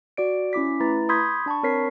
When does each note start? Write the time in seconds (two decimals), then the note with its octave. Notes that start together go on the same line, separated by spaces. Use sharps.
0.17 F#4 D5 D7
0.53 C#4 E4 D6 B6
0.80 A3 E4 B4 A#5 A6
1.09 B5 C6 D#6 G6 G#6 B6
1.46 D4 A5 B5 C#6
1.63 C4 A#4 C#5 B6 C7